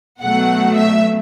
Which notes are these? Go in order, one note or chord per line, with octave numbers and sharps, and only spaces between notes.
B2 F#3 A3 F#5
E5